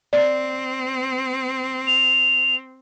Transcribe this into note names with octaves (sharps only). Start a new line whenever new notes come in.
C4 D5
F7